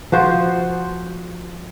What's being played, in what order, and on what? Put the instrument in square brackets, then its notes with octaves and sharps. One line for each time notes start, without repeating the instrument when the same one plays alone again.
[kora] F3 F#4 C5